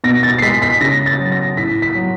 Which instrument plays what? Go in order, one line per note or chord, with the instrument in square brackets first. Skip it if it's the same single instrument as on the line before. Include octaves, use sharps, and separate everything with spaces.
[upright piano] B2 A#6
A6
C7
G#3 B6
B6
C#3 A#6
A6
F#3
A#6
A2 B6
B6
F#3